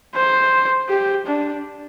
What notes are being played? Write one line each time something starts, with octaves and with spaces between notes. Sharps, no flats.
C5
G4
D4